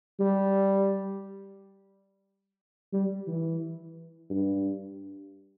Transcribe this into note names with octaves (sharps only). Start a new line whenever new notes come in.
G3
G3
E3
G2